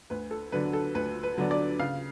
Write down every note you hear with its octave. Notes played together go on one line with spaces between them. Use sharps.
D2 B4
A4
D3 F#3 B3 D4 B4
A4
D2 B4
B4
D3 F#3 B3 D4
D5
C#3 F5